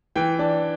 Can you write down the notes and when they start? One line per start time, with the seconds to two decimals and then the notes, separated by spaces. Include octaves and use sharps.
0.16 E3 G5
0.39 D4